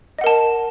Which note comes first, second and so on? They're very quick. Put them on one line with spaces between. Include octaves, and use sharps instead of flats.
D#5 F#5 A#4 A5